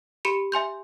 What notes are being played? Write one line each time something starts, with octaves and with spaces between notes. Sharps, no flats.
G4 B5 C#7 E7
E5 G#5 C6 G6